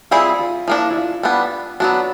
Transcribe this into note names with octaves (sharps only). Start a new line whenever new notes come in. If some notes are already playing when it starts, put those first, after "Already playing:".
G3 C4 E4 F4 G#4
F4
F3 A#3 D4 E4
E4
F4
G3 B3 D4
F#3 B3 D4 F#4